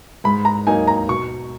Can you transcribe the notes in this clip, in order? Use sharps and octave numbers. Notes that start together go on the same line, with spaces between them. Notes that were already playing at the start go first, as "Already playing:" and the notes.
G#2 B5
A#5
F#3 A#3 D#4 G#5
A#5
B2 C#6